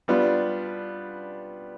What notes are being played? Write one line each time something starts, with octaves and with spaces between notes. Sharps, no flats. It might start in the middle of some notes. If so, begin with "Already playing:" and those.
G3 B3 D4 F4